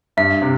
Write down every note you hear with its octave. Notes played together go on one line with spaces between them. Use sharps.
G2 E5
C3